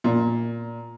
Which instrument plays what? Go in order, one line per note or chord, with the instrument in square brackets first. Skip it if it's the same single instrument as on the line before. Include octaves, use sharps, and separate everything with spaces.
[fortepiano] A#2